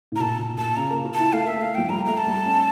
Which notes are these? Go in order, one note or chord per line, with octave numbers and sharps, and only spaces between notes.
A2
A#5
A#2 A5
A#2
A#2 A5
C#3 A#5
A#3
F4
E4 A5
A3 F5
A#3 E5
A3 F5
F3 G5
G3 A#5
A3 A#5
A5
G3
C#4